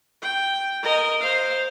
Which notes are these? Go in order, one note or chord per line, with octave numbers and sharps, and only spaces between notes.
G5
A#4 D#5
C5 F5